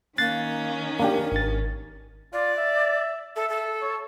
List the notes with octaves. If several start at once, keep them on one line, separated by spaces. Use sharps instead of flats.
D#3 A#3 C#4 F#6 A6 C7
A#3 D4 G4 A#4
G#1 A6
F4 D5
E5
A4 E5
A4
C#5